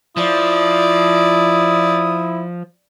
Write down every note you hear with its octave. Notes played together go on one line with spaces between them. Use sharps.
F3 E4 D5 D#6